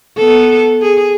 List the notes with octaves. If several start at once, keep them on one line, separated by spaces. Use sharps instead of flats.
B3 A4
G#4